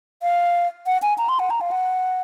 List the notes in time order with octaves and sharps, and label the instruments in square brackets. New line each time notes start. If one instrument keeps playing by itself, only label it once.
[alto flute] F5
F#5
G#5
A#5
C6
F#5
A#5
F5
F#5